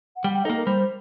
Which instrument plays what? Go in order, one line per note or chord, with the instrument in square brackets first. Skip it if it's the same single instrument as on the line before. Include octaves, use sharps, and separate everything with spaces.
[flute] F#5
[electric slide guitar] G3 [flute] G5
[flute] F#5
G5
[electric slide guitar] A#3 D#4 [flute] A4
[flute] A#4
[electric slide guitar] G3 [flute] C5